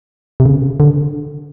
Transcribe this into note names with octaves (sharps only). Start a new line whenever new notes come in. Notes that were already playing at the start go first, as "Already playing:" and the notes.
C3
C#3
D3